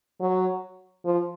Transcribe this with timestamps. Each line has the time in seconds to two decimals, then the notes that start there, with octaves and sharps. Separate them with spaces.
0.21 F#3
1.05 F3